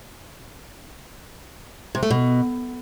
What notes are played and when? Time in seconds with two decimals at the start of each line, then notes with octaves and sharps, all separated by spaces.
1.95 C3
2.03 A3
2.11 B2